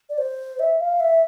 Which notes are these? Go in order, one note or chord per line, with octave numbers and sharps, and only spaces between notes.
D5
C5
E5
F5
E5